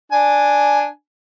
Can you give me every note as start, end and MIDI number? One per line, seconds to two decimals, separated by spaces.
0.12 0.86 62
0.12 0.86 80